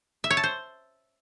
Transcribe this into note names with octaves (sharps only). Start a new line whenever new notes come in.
E5
C#5
A5
C5